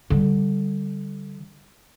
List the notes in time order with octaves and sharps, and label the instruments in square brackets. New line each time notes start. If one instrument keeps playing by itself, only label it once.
[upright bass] D3 G3